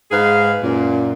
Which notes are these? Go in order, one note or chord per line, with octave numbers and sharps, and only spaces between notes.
G#2 G#3 G#4 B4 F5
F#2 A#2